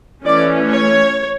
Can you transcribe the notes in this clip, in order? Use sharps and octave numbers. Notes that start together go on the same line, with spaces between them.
E3 A3 C#4 D5
C#5